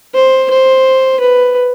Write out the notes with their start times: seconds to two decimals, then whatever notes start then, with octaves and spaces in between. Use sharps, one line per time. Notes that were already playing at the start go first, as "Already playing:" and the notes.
0.14 C5
0.50 C5
1.20 B4